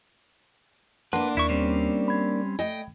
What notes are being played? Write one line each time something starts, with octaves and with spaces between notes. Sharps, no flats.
A#3 D4 B4 F#5 A5 C6
D#2 E4 C#6
G3 C4 C#4
B5 G#6
A3 D#5 G5